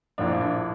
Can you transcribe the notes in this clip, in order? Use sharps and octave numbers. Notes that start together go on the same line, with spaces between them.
A#1 A2 F3 A#3 D4